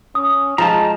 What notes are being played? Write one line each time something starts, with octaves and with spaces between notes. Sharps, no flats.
C#4 D#6
F3 G#3 A5 A#5